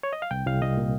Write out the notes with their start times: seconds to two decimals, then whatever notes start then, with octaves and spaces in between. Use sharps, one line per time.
0.03 C#5
0.13 D#5
0.22 F5
0.31 C2 G5
0.46 C2 F5
0.62 C2 D#5
0.77 A#2